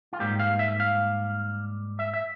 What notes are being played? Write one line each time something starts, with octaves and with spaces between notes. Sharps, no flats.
F4
G#2 G3 A#3 G4
F5
E5
F5
E5
E5